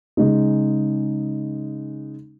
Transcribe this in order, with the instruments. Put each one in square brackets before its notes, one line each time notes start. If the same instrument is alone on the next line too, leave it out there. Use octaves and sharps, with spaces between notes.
[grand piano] C#3 G#3 D#4